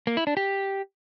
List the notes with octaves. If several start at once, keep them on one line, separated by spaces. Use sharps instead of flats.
A#3
E4
D4
G4